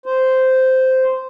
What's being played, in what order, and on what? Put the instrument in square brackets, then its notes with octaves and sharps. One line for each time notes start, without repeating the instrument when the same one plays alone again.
[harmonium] C5